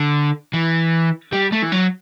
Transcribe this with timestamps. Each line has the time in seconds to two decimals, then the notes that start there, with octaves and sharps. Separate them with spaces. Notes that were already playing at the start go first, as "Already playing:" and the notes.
Already playing: D3
0.53 E3
1.32 G3
1.52 A3
1.62 E3
1.72 F#3